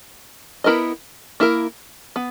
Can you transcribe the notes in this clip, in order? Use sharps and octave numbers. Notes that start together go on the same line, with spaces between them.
B3 E4 A#4 D#5
A#3 E4 A#4
B3